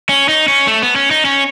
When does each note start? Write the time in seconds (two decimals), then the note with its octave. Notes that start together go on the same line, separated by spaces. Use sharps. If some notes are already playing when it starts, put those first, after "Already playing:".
0.09 C#4
0.29 D#4
0.48 C#4
0.67 A3
0.82 B3
0.96 C#4
1.11 D#4
1.25 C#4